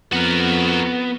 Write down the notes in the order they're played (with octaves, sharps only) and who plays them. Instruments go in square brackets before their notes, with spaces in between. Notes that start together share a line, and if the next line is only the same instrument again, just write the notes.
[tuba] F2 [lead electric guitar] B3 [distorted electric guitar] F#4 A#4